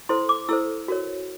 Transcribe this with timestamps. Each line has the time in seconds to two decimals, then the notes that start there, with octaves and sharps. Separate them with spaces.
0.09 E4 A4 C5 C6
0.29 D6
0.49 E4 A4 C5 E6
0.88 F#4 A#4 C#5